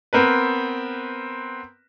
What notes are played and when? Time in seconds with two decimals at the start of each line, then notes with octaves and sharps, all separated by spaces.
0.13 B3 C4 A#4 B4